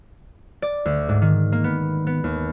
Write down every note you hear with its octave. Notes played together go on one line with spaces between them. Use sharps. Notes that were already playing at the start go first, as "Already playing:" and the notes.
D5
D2
G#2
D#3
A#3
B3
B3
D#2